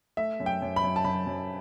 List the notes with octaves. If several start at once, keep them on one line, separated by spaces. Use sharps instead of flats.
A3 E5
F#2
G5
F#2
B5
F#2
A5
F#2 B5
F#2